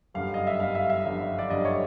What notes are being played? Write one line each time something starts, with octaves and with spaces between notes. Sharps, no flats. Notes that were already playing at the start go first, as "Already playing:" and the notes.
G1 F#2 D3 G3 F5
D#5
E5
G1 F#2 D3 G3 F5
E5
E5
G1 F#2 D3 G3
D5
G1 F#2 D3 G3 D#5
C#5